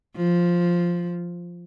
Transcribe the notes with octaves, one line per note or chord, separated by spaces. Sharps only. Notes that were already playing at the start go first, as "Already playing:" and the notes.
F3